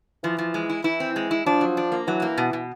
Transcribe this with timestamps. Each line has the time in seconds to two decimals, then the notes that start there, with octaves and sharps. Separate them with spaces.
0.24 E3 F3
0.38 F3
0.54 G#3
0.69 E4
0.84 E3 E4
1.00 C4
1.16 G#3
1.31 E4
1.46 F3 D4
1.61 F#3
1.77 D4
1.92 A#3
2.07 E3 F#3
2.22 A#3
2.38 B2
2.53 B2